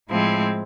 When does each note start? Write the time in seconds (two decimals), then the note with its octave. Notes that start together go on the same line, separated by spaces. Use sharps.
0.09 A2 F3 G#3 C4 E4